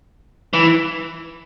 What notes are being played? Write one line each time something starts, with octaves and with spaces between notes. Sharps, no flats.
E3